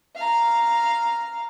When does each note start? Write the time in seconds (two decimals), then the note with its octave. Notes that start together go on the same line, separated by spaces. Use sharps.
0.16 F5 A#5